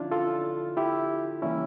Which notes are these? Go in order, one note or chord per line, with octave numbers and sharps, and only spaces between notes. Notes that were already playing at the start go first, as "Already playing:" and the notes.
Already playing: D3 F3 C#4 D4 E4 F4
F4 A4
E4 G4
C#3 E3 G3 A#3 C#4 E4